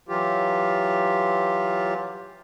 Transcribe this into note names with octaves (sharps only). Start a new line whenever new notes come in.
E3 F#3 F4 G4